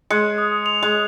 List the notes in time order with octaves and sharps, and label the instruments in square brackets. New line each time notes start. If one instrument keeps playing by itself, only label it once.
[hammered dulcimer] G#3 [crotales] C#7
[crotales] D#6
F7
[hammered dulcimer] G#3